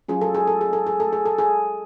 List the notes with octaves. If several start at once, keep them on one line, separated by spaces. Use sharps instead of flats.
F#3 C#4 F4 G#4
A4
G#4
A4
G#4
A4
G#4
A4
G#4
A4
G#4